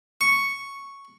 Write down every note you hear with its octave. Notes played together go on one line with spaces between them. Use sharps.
C#6